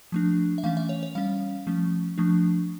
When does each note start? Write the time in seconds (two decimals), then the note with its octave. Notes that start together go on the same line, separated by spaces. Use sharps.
0.12 F3 A3 D4
0.58 E5
0.64 E3 A3 C#4 F5
0.77 E5
0.89 C#5
1.03 C#5
1.15 G3 C#4 F5
1.67 F3 A3 C#4
2.18 F3 A3 D4